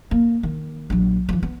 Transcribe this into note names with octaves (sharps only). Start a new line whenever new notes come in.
A#3
D#3
A#1 F#3
E3 F3
B3